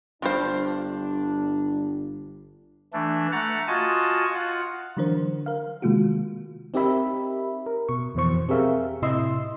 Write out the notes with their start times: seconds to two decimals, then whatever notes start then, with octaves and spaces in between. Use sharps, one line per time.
0.22 G1 G2 D4 F4 C5
2.93 E3 A3 D4
3.32 A3 F#5 A#5 A6
3.67 F4 F#4 D#5 G#5 A5
4.34 F4 F#5
4.97 D3 E3 F#3 D4 A#4 C5
5.46 A#4 F5
5.82 C3 D#3 G#3 A#3 F4 F#4
6.74 C4 D#4 G4 A#4 E5 B5
7.66 A#4
7.89 B2 C#6
8.15 F2 B2 E3 C5 C#6
8.49 C4 G4 G#4 A#4 E5 F5
9.02 A2 C3 E4 D#5 C6 E6